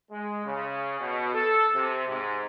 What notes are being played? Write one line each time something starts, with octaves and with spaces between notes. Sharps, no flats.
G#3
C#3
B2
A4
C3
G#2